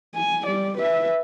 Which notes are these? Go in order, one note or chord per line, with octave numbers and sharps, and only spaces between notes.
G#5
G3 D5
B4 E5